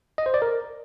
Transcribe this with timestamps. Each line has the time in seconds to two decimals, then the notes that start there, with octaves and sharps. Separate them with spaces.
0.18 D#5
0.26 C5
0.34 D5
0.42 A#4